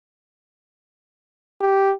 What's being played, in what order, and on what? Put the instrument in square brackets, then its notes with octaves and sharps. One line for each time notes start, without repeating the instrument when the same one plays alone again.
[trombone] G4